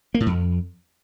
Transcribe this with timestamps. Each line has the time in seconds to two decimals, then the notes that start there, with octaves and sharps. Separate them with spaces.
0.14 A#3
0.20 A2
0.26 F2